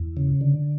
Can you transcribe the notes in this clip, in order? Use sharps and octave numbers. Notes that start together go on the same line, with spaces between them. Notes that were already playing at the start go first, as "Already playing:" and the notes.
Already playing: E2
C#3
D3